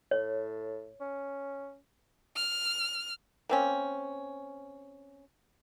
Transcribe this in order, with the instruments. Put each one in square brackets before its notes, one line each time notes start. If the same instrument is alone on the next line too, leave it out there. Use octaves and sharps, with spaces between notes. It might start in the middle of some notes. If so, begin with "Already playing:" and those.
[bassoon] A2 [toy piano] C#5
[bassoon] C#4
[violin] F6
[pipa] A#3 C4 C#4